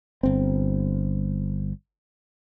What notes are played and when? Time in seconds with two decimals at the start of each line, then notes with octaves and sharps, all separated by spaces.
0.23 G1 C4